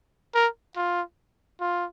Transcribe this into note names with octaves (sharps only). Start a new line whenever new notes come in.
A#4
F4
F4